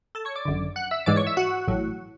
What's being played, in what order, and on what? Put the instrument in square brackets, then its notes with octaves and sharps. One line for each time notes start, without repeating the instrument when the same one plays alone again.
[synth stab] A4 A5
C#5 C#6
D5 D6
G#1 F#2 D3
F#5 F#6
E5 E6
G#2 E3 G#3 D5 D6
C#5 C#6
E5 E6
F#4 F#5
A1 A2 F#3